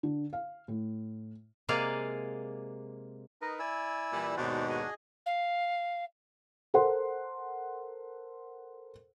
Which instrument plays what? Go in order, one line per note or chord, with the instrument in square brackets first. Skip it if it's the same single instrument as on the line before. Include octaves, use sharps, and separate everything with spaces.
[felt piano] D3
F5
A2
[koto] C3 G#3 A#3 G#4 D5 F5
[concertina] D#4 A#4 B4 [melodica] D#5
[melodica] E4 E6 [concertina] D5 G#5
[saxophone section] A#2 E3 G3
[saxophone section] D#2 G#2 B2 [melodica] D4 F#4 [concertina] C5 D5
[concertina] G#4 D#5 G#5
[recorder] F5
[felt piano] A4 A#4 C5 F#5 C6